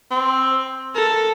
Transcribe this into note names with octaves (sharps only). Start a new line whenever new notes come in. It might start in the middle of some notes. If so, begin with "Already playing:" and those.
C4
A4 A#4